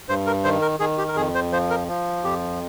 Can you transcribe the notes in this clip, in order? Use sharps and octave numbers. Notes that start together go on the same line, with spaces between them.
G2 C5
A#4
D#3 C5
A#4
D#3 G#4
G4
A#4
F2 G#4
C5
F3 C5
A#4
F3
F2 G4